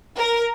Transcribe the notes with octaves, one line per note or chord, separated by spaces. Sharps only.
A#4